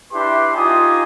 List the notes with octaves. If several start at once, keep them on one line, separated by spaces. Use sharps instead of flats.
D4 E4 G4 B4 C6
D#4 F4 G4 G#5 D#6